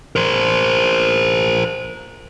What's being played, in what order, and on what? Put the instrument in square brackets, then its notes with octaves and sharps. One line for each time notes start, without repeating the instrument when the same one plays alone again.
[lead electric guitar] A#4 C5